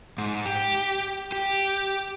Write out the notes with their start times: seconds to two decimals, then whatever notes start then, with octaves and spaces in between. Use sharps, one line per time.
0.18 G#2
0.46 G4
1.32 G4